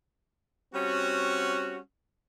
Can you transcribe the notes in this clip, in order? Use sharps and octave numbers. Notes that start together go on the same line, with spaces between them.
G3 C4 C#4 F#4